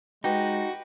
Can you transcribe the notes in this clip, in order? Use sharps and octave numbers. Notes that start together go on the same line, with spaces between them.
G#3 D#4 F#4 G4 B4